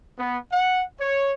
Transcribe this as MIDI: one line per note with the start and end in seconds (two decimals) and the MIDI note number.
0.19 0.39 59
0.52 0.85 78
1.01 1.32 73